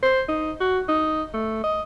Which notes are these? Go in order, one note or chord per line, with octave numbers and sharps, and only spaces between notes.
C5
D#4
F#4
D#4
A3
D#5